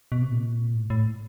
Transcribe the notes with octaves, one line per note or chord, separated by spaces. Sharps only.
B2
C3
A#2
A2
A2